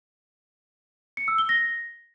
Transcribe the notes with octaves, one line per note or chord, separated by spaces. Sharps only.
C#7
E6
G7
A#6